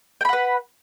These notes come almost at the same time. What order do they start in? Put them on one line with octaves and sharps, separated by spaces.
G5 B5 F#5 B4